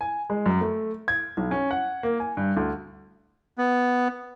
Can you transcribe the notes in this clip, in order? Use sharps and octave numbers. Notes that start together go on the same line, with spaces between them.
G#5
G#3
F#2
A3
G#6
B1
C#4
F#5
A#3
G#5
G2
D2
B3